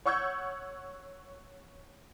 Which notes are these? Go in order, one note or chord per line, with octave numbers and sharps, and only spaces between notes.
C#5 F#5 C#6 E6 G6 G#6